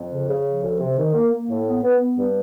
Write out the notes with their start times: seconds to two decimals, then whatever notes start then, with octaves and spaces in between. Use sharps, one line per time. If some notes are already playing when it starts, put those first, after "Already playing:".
Already playing: F2
0.11 C#3
0.28 C#3
0.45 F3
0.63 D2
0.80 C3
0.97 D#3
1.14 A#3
1.32 A#3
1.49 A2
1.65 B3
1.83 B3
2.00 B3
2.17 G2